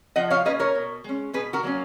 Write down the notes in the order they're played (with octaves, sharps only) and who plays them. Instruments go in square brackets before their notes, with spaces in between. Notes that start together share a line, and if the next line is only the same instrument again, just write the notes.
[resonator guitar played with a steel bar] F3 D#5 F#5
C#5 F5
A#3 C#4 B4 D#5
A#4 C#5
B2
G#3 C#4
B2 G#4 B4
F#4 A#4
F#3 A#3 C#4